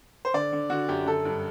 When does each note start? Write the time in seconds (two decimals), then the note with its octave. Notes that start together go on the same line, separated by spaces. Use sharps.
0.25 C5
0.34 D3 D5
0.53 D3
0.70 D3 F#4
0.88 F#2 G4
1.06 D3 A4
1.25 G2